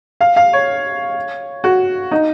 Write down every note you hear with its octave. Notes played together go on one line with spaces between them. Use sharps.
F5
F5
C#5
F#4
D#4